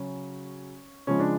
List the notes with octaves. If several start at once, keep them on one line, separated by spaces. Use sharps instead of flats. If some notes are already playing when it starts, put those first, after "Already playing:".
Already playing: C#3 F#3 C#4
C#3 F3 G#3 C#4
D4